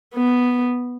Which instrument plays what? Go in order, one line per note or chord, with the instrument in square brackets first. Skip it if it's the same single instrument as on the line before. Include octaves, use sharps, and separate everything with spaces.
[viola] B3